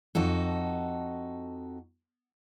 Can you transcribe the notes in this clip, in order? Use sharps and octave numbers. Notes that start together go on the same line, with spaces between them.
F2 D#4 F#4 A4